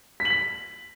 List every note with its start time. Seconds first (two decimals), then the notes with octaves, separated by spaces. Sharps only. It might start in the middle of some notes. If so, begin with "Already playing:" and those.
0.20 B6
0.25 F#7
0.30 B6